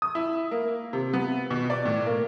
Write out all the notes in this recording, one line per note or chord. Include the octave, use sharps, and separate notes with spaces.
D#6
E4
A#3
C3
B3
B2
D5
A2
A#3